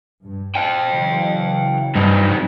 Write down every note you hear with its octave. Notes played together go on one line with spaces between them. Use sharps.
G2
A#2 F5 G5
C#3 E3 F#3
G2 C3 D#4